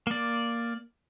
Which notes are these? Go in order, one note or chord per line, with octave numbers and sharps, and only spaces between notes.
A#3 D5